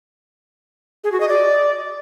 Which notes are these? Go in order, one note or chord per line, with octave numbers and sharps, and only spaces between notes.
G#4
F#4
D#5
D5